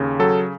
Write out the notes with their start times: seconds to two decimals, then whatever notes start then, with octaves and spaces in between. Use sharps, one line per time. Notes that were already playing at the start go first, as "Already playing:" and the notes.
Already playing: D#2 C#3
0.19 F#3 A4